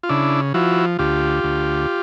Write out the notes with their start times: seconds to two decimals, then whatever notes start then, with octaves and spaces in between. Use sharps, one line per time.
0.03 F4
0.09 C#3 D4 E4
0.54 F3 E4 F#4
0.99 D2 F4 G4
1.44 D2